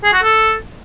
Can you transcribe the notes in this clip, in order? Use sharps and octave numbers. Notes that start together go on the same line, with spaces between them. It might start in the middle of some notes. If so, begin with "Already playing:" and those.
G#4
F#4
A4